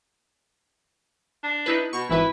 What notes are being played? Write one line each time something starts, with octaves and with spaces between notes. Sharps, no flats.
D4
D#4 E4 B4
B2 C#6
G#1 E3 E4 B4